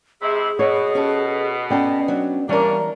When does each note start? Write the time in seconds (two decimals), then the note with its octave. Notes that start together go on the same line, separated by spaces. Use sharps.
0.22 C3 G#3 E4 G#4
0.59 B2 C#5
0.95 C#4 G4 A4
1.71 B3 C#4 A4 D5 G5
2.08 F#3 D4
2.49 E3 G3 A#3 C#4 D4 A#4 D5